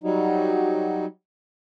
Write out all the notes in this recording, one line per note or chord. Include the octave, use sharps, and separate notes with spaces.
F#3 G3 D#4